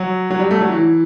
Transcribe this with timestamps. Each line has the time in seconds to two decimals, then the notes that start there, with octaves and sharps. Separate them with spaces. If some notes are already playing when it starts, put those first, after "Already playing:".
Already playing: F#3
0.30 F#3
0.40 G3
0.51 A3
0.61 F#3
0.72 E3